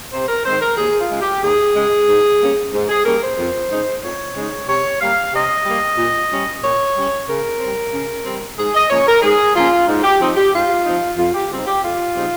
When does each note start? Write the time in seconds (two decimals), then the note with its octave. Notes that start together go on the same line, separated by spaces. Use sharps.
0.13 C3 C5
0.29 A#4
0.46 D#3 G#3 C4 C5
0.62 A#4
0.78 D#2 G#4
1.00 F4
1.10 C#3 G#3
1.21 G4
1.42 D#2 G#4
1.75 C#3 G#3
2.08 G#2
2.40 G3 A#3 C#4
2.74 G#2
2.89 G#4
3.05 G3 A#3 C#4 A#4
3.21 C5
3.39 F2
3.70 C#3 G#3 D#4
4.03 F2 C#5
4.35 C#3 G#3 D#4
4.68 C3 C#5
5.01 G3 A#3 F5
5.33 C3 D#5
5.65 G3 A#3
5.97 A#2
6.31 G3 C#4
6.63 A#2 C#5
6.96 G3 C#4
7.27 C#3 A#4
7.60 G3 C4
7.93 C#3
8.25 G3 C4
8.58 G#2 G#4
8.75 D#5
8.90 F3 A#3 C#4 C#5
9.07 A#4
9.23 G#2 G#4
9.55 F3 A#3 C#4 F4
9.88 G#2
10.04 G4
10.20 F3 C4 D#4
10.37 G4
10.53 G#2 F4
10.85 F3 C4 D#4
11.18 F2 F4
11.34 G4
11.51 C#3 G3 C4 D#4
11.67 G4
11.83 F2 F4
12.15 C#3 G3 C4 D#4